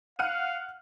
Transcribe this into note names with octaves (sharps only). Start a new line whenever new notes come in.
F5 F#5 F6 D#7